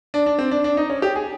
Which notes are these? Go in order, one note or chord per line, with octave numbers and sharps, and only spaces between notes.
D4
D4
C4
D4
D4
D#4
C#4
G4
G#4